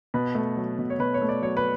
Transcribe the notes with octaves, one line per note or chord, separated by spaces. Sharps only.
B2 B4
A3
F#3
B2
C#5
B2 B4
C#5
A3
D5
F#3 C#5
B4